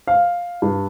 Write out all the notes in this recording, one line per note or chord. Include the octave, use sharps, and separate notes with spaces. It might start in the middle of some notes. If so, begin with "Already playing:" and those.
F5
G2